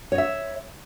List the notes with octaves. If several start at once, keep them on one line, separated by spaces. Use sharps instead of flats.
C#5 D#5 E5